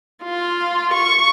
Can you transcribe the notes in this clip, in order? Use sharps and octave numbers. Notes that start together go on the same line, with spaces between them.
F4
C#6